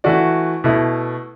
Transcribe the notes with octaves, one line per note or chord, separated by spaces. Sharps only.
E3 A3 F#4 D5
B2 A3 E4